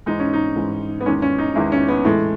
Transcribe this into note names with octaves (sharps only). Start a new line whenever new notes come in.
G#2 E3 G#3 D#4
C#4
D#4
G#2 E3 G#3
B3
E2 D#3 G#3 C#4
C#4
D#4
E2 D#3 G#3 E4
C#4
B3
A2 E3 G#3 A3